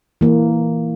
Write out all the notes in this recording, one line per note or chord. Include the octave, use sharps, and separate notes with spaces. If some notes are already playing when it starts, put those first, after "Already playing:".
E3 A#3